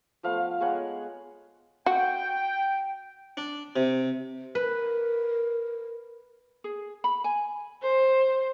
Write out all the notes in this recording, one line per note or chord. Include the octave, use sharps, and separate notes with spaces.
F3 A3 B3 F5
G#3 B3 C#5 F#5
F#4 G5
D4
C3
A#4 B4
G#4
B5
G#5
C5